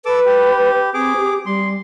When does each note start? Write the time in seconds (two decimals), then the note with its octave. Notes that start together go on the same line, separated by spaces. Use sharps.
0.05 A4 B4 D6 E6
0.25 G4
0.94 C4 G#4 D6
1.17 G4
1.46 G3 C6